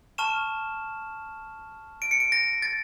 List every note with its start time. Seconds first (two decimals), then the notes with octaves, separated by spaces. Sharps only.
0.18 A5 C#6 F6 E7
2.02 D7
2.11 C#7
2.20 D7
2.32 A#6
2.62 A6